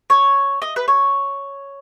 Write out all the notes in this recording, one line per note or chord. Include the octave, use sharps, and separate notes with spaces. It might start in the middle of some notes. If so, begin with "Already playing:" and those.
C#5
D#5
B4
C#5